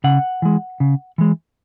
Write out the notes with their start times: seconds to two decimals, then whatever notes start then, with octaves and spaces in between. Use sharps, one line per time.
0.04 C#3 F#5
0.42 E3 G#3
0.80 C#3
1.18 E3 G#3